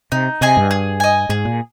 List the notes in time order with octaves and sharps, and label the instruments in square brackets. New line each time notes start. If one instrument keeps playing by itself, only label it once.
[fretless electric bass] C3 [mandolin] D#4
[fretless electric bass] C3 [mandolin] G#4 D#5 G#5
[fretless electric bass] G2
[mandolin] G#4
D#5 G#5
[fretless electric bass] G#2 [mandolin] G#4
[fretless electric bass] A#2